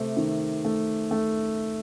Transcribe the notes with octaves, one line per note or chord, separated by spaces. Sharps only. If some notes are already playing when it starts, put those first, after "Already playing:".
Already playing: C3 A3
D#3
A3
A3